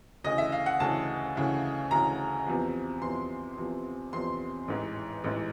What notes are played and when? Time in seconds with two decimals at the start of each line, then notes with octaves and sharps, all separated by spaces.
0.24 D2 C#3 E3 D#5
0.38 E5
0.52 F5
0.66 F#5
0.80 D2 C#3 E3 A5
1.35 D2 C#3 E3
1.91 D2 C#3 E3 A#5
2.46 E2 C3 F3
3.02 E2 C3 F3 C6
3.58 E2 C3 F3
4.13 E2 C3 F3 C6
4.68 A1 G#2 E3
5.24 A1 G#2 E3